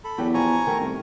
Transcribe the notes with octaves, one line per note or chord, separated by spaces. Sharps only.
A4 B5
E2 F#3 G4 B4
F3 D4 G#5 A#5 C#6
D#3 A3 A#4
C2